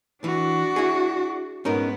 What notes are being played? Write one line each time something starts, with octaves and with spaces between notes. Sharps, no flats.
E3 D4 F#4
E4 G#4
G#2 B3 C#4 D#4 A#4